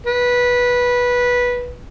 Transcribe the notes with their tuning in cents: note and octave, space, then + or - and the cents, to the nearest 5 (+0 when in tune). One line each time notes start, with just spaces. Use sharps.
B4 -15